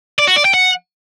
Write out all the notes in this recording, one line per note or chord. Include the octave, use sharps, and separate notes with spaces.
D5
F#4
D5
G5
F#5